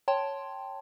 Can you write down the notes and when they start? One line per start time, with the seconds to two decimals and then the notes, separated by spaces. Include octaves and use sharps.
0.08 C#5 G5 A5 C6